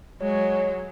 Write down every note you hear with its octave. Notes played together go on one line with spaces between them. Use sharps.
F#3 G#3 C#5